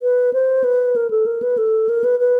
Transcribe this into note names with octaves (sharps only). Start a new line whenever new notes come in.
B4
C5
B4
A#4
A4
A#4
B4
A4
A#4
B4
B4